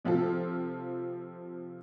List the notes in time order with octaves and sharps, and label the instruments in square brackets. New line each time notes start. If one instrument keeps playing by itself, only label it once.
[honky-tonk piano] C3 F3 C4 F4 A4